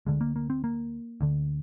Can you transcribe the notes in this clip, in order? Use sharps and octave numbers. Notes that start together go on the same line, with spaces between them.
D2 D3 G#3
A#3
A#3
C4
A#3
D2 D3